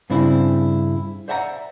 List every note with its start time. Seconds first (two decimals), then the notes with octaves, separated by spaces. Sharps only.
0.10 G2 C#3 C4 D4 E4
1.28 C5 D5 E5 F#5 G#5 A#5